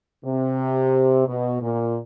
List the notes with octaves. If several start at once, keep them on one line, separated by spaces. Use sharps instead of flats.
C3
B2
A#2